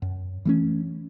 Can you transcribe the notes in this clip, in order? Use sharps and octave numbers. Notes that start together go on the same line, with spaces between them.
F#2
E3 A3 C#4